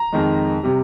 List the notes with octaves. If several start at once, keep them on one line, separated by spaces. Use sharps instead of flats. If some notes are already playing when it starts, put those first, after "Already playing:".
Already playing: A#5
F2 D#3 G#3
C3 G3